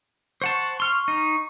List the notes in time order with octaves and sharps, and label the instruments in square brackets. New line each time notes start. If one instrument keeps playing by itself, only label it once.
[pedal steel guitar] C5 F#5 A5 [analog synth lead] C#6
[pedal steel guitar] C6 F6
D#4